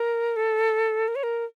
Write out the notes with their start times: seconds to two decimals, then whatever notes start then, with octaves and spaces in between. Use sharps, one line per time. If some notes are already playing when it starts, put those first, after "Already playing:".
Already playing: A#4
0.36 A4
1.08 A#4
1.16 C#5
1.23 A#4